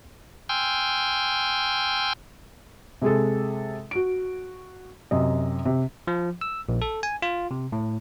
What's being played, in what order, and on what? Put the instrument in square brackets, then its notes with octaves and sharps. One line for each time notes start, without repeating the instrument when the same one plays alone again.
[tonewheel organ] G5 G#5 C6 E6 F6 G6
[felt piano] C3 G#3 G#4 A4
F#4 D7
F#2 C3 D#5
C3
[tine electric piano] F3
E6
A#1
A4
G#5
F4
C3
A2